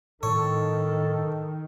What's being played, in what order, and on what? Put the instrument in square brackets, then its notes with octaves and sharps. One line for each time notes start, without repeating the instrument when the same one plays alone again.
[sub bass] A2 [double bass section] D#3 [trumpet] A4 [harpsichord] C#5